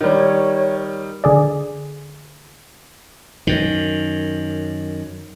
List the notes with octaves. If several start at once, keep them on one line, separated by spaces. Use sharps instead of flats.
D#3 G3 C#5
D3 G#4 D5
F#2 D#3